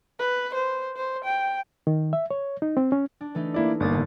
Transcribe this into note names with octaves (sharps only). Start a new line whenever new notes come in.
B4
C5
C5
G5
D#3
E5
C#5
D#4
C4
C#4
D4
E3 A3 D#4
A#3 E4 D5
G1 A#3 D5 D#6 A6
G#2 D3